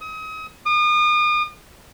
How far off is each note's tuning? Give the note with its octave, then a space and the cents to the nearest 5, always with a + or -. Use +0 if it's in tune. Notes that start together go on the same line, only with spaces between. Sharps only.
D#6 +35
D#6 -40